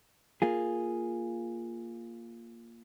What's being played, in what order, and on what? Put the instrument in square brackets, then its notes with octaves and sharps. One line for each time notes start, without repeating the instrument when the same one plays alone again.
[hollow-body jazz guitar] A#3 F4 G#4